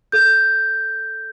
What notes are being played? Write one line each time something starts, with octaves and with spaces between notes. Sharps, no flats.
A4 G6